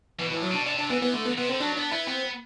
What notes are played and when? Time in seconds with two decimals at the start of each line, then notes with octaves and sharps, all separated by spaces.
0.19 B2 E3
0.30 A2 E3
0.42 F#3
0.51 B2 D4
0.66 C3 D4
0.78 D4
0.90 E3 B3
1.02 B3
1.13 D3 A3
1.25 B3
1.37 C3 B3
1.49 D3 C4
1.60 F#3 D4
1.76 B3 D4
1.92 B3 E4
2.07 B3 C4